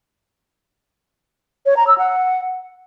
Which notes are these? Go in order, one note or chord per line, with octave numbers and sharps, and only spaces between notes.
C#5
A#5
E6
F#5